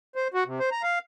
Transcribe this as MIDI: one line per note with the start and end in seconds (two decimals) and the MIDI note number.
0.15 0.28 72
0.34 0.44 66
0.46 0.59 48
0.59 0.70 72
0.71 0.82 82
0.83 0.99 77